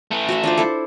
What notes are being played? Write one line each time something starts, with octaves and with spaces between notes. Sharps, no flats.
E3 A3
F#4 E5 A5
D4 F4 C5
E4 A4